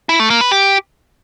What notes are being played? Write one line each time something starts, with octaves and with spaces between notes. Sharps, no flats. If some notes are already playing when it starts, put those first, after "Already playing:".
E4
A3
A#3
B4
G4